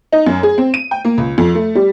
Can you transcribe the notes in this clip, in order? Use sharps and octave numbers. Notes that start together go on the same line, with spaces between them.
D#4
F#2
G#4
C4
D#7
G5
A#3
C#2
F2
A3
G3